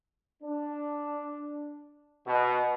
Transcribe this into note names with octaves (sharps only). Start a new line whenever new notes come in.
D4
B2